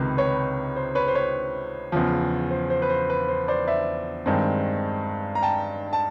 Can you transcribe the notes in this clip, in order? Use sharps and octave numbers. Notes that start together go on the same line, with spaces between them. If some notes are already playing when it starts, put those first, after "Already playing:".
Already playing: C#2 C3 D#3 B4
B4 C#5
C5
B4 C#5
C5
B4 C#5
E2 C#3 F3
C5
C5
B4
C5
B4
C5
C5 D5
D5 E5
G2 D#3 G#3 C4
A#5
G5 A5
A5